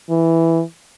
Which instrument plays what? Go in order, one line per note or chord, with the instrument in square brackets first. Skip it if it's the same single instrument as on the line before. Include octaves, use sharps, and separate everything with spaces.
[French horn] E3